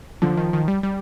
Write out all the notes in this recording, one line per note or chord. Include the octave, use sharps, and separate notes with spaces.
D3 F3
D#3
D#3
G3
G3